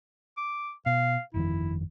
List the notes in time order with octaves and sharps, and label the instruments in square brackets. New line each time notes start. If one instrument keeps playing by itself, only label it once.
[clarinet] D6
[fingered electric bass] B2 [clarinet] F5
[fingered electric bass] G1 F2 D#3 [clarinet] E4